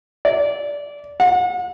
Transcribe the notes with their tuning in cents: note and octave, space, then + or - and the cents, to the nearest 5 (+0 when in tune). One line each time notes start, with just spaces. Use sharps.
D5 -20
F#5 -40